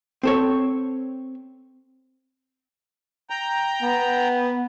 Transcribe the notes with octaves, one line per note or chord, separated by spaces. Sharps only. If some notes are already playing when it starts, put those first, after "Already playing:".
C4 A4 C#5
G5 A#5
B3